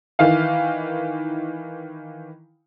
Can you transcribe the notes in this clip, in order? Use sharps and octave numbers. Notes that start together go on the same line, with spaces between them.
D#3 E3 F5